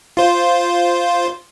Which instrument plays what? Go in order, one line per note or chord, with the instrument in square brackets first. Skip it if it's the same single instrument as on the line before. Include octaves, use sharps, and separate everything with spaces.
[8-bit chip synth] F4 C5